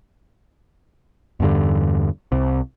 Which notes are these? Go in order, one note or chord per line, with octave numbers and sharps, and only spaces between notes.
E2 G2 D3
C2 C3